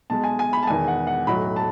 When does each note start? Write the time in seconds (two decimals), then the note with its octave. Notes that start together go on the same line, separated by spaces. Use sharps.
0.10 B1 B2 G#3 A5
0.24 G#5
0.39 G#5
0.53 B5
0.63 A5
0.67 E1 E2 D#3 G#5
0.88 F#5
1.07 F#5
1.27 B1 A2 F#3 B5
1.56 A5